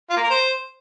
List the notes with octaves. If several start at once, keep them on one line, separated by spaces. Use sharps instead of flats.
F4
A#3
A#4
C5